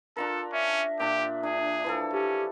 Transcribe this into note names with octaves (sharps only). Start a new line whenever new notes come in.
D4 F4 A4 A#4
C#4 E5
A#2 D4 G4
D4 G#4
E3 F3 A4
C#4 G4